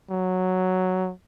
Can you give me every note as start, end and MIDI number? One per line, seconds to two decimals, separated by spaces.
0.10 1.12 54